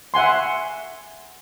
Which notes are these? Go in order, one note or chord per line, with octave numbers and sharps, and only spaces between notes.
E5 F#5 G#5 C6